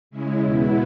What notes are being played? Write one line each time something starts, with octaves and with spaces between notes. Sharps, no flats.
C#3 G#3 C#4 E4
E2 B2 B3 E4